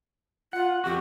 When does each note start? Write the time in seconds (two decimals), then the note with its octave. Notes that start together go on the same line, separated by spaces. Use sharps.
0.53 F4 F#5
0.84 F2 F#4 G4